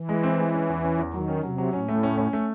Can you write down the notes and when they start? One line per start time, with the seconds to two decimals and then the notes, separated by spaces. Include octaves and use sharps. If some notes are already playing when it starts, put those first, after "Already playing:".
Already playing: E3
0.09 G#3
0.23 C4
0.38 G#3
0.54 C#4
0.69 E2
0.84 C#4
0.98 E2
1.13 D#3 F#3
1.28 C#4
1.43 C3 F#3
1.58 F#3
1.73 A2 C#4
1.88 A3
2.03 C#4
2.18 C#4
2.33 A3